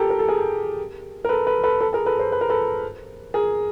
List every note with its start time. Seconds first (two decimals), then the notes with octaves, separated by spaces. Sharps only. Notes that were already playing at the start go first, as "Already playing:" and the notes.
Already playing: G4 A4 A#4
0.10 A#4
0.19 A4
0.28 G#4 A#4
1.25 A#4
1.29 A4 B4
1.47 A4 B4
1.64 A4 B4
1.81 A4 B4
1.93 G#4 A#4
2.06 A4 B4
2.19 A#4 C5
2.32 B4
2.41 A#4
2.50 A4 B4
3.34 G#4 A#4